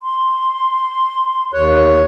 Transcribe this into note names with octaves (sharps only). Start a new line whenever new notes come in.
C6
D#2 C#5 F#6